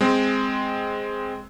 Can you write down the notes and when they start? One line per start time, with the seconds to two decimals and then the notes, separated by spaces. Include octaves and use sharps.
0.01 G#3 C4